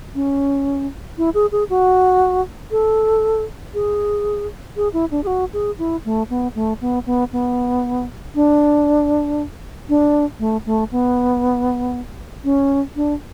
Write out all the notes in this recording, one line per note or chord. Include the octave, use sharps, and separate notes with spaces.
C#4
E4
G#4
G#4
F#4
A4
G#4
G#4
E4
D4
G#4
F#4
G#4
E4
A3
B3
A3
B3
B3
B3
D4
D4
A3
A3
B3
C#4
D4